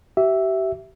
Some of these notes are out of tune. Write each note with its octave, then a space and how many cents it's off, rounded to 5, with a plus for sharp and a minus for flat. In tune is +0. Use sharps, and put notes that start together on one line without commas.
G4 -35 E5 +0